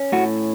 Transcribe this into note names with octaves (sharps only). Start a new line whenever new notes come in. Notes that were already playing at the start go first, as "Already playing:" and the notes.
Already playing: C#4
A2 F#4